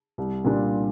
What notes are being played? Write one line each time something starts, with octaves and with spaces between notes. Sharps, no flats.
C2
A#2 G3 D4 F4